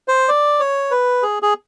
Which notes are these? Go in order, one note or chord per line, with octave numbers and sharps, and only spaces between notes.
C5
D5
C#5
B4
G#4
G#4